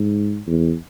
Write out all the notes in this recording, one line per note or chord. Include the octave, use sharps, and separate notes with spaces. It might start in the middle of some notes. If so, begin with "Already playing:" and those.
Already playing: G#2
E2